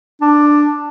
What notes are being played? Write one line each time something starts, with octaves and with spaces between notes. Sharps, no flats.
D4